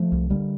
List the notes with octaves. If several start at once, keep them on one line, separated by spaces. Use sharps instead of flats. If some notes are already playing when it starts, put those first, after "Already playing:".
Already playing: F3 A3
C2
D3 G3 A#3